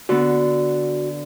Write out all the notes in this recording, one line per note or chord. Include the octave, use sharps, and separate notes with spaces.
D3 B3 F#4